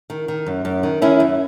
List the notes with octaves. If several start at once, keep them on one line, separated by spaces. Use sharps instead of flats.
D#3
D#3
F#2
F#2
D#3
D#3 C#4 E4
F#2